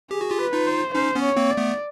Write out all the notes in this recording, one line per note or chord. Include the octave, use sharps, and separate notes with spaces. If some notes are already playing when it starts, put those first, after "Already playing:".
G4 G#4
F#4
F4 G4
B4
D#4 F4
C5
C#4 D#4 C5
B3 C#4
C#5
A#3 C4
D5
A3 B3